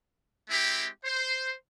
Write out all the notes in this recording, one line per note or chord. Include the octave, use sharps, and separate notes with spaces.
G#3 C4 E4 G4
C5